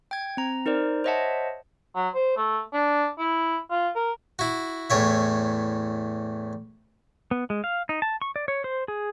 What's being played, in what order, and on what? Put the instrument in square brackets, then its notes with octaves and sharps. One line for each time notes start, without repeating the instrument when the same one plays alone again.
[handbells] G5 G#6
C4 A#5
D#4 A#4 C5 D5
C5 C#5 D#5 E5 F#5 A5
[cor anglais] F#3
C5
A3
D4
E4
F4
A#4
[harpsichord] E4 F#4
E2 A2 C#5 E5
[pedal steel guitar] B3
G#3
F5
D#4
A5
C#6
D5
C#5
C5
G#4